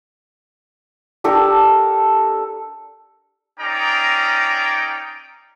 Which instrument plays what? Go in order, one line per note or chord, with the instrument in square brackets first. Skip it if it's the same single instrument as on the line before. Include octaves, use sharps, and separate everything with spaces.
[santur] D4 G4 A4 A#4
[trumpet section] C#4 D#4 G#4 D5 G5 A#5